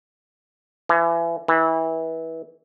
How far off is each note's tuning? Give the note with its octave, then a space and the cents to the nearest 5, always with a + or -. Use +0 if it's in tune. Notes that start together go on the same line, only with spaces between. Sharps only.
E3 +30
E3 -25